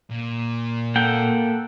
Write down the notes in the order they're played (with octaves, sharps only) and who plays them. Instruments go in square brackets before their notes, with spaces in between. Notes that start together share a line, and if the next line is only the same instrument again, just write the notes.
[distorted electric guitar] A#2
[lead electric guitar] A#3 F#5 [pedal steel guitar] A4 G5